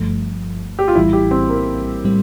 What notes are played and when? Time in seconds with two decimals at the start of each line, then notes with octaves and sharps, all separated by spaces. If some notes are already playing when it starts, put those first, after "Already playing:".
Already playing: G1 G2 F3 A3
0.79 G4
0.88 F4
0.95 A#1 A2 E3 G3 E4
1.13 G4
1.31 C4
1.49 A#3
2.04 A2 G3 C4